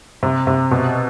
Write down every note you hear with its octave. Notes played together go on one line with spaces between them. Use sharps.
C3
C3
B2